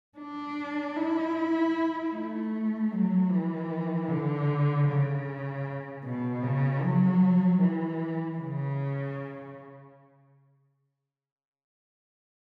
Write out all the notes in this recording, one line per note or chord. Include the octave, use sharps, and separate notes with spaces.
D4
E4
A3
F#3
E3
D3
C#3
B2
C#3
F#3
E3
C#3